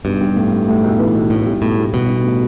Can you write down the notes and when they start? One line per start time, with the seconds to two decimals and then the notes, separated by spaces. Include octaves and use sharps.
0.05 B1 G2
0.21 G3
0.36 A2
0.52 A2
0.68 A2
0.84 B1
0.99 E3
1.15 B1
1.30 B1 A2
1.46 G3
1.62 B1 A2
1.77 B1
1.93 B2 G3
2.09 B1
2.24 A2